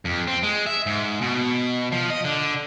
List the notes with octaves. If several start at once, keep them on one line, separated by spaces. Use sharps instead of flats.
F2
C4
G#3
E5
G#2
B2
F3
D#5
D3